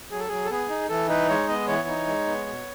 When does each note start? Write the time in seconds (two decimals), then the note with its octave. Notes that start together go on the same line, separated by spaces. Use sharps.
0.11 F#3 G#4
0.20 A4
0.28 F#3 G#4
0.45 A4
0.50 B3 G#4
0.69 D#4
0.89 E3 A4
1.09 D#4 B4
1.29 G#3 C#5
1.48 B3 D#5
1.68 E3 C#5
1.88 D#4
2.07 G#3
2.27 B3
2.47 B2